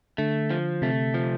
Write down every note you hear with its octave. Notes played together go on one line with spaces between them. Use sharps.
D3 A3
F3
C3 A3
F3